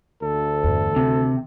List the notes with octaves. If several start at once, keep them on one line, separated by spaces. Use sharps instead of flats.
D2 A4
E2 G2
C3 D#3